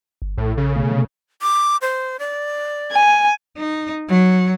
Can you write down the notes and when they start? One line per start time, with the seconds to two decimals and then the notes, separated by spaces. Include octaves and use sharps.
0.22 G1
0.37 A#1 A2 A4
0.57 C#3
0.76 B2 A3
0.91 C3
1.42 D6
1.82 C5
2.19 D5
2.92 G#5
3.57 D#4
4.08 F#3